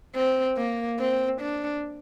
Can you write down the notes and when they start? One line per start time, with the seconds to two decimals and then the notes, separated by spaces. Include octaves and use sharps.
0.15 C4
0.57 A#3
1.00 C4
1.41 D4